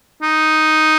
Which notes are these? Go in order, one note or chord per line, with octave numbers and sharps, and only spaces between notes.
D#4